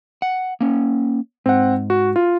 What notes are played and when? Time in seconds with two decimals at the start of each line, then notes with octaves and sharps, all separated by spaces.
0.22 F#5
0.60 A#3 C#4
1.46 G#2 C4 F#5
1.90 F#4
2.16 F4